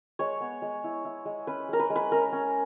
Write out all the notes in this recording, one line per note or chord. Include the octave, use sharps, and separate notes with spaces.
G#3 C#5
B3
G#3
E4
E4
G#3
C#4 B4
G#3 A#4
B4
G#3
B4
C#4 A#4
C#4